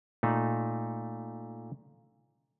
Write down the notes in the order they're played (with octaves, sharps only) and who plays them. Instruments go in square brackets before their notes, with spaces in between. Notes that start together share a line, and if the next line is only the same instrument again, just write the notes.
[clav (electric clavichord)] A#2 A3 D#4